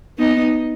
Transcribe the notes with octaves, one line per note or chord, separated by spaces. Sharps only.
B3 D#4